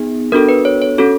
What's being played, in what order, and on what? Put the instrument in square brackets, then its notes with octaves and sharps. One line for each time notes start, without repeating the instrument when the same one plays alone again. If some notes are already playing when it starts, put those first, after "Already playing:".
Already playing: [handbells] B3 D#4 G#4
B3 D4 F#4 A4 A#4
B4
C#5
C#5
C#4 F#4 A4